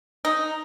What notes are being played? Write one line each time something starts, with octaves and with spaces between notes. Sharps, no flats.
D#4